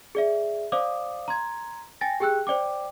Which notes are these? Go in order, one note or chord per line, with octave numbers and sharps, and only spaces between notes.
G#4 D5 E5
C5 D5 F5 D6 D#6
A#5 C6 G#6
G5 G#5 A6 A#6
G4 G#4 G5 E6 F#6
C5 D5 G5 D6